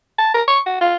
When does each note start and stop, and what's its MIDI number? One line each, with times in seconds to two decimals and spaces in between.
0.19 0.31 81
0.34 0.42 70
0.47 0.60 85
0.66 0.77 66
0.81 0.96 65